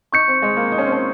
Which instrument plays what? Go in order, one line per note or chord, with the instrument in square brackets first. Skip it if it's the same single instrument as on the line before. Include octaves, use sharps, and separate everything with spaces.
[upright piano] D#4 [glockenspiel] C#6 G6 C#7
[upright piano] C4
G#3
A#3
D#4
C#4
C4
C#4